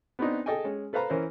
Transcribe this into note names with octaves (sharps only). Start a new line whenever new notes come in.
B3 C4 D4 D#4
G#4 A4 D#5 G5 G#5
G#3 C#4
A4 B4 C5 F5 A#5 B5
E3 C#4 A#4 C5